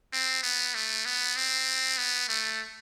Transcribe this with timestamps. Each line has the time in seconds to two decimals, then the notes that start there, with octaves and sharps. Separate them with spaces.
0.13 C4
0.43 B3
0.74 A3
1.05 B3
1.36 C4
1.98 B3
2.29 A3